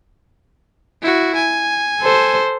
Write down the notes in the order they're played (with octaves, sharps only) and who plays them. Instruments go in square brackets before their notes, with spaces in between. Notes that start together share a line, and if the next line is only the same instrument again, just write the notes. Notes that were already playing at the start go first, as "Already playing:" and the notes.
[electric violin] E4 F#4
G#5
[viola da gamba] A4 C5